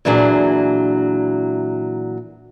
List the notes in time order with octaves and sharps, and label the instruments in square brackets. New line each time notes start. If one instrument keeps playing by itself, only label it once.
[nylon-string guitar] A#2 E3 F#3 D4 G#4